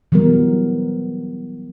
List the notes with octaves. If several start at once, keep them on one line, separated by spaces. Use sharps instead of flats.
E3 F#3 G3 B3 A#4